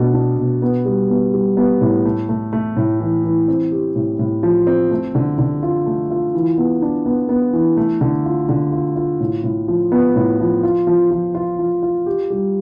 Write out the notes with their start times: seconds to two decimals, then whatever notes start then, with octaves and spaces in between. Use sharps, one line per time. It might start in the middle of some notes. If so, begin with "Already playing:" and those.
Already playing: B2 A3 D4
0.14 D4
0.38 B2
0.62 B3
0.85 G3
1.10 B3
1.33 G3
1.57 B3
1.81 A2
2.05 A3
2.29 A3
2.53 A3
2.77 A2
3.00 E3
3.24 E3
3.48 C4
3.71 G4
3.96 A2
4.19 A2
4.43 F3
4.67 C4
4.91 A3
5.15 D3
5.38 D3
5.63 F4
5.86 A3
6.10 F4
6.34 E3
6.58 B3
6.82 D4
7.06 B3
7.29 B3
7.53 E3
7.77 A3
8.01 D3
8.25 F4
8.49 D3
8.72 F4
8.96 F4
9.21 A2
9.44 A2
9.68 F3
9.92 B3
10.16 A2
10.40 F3
10.63 F4
10.87 F3
11.11 F3
11.35 F4
11.59 F3
11.83 F4
12.06 G4
12.30 G3